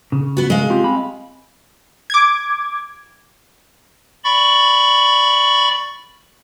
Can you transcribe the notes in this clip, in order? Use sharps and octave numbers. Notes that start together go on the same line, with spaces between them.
C#3
B3 F#4
G#3 F5
C4 F4 G4
C4 B5
D6 G#6
D5 B5 C#6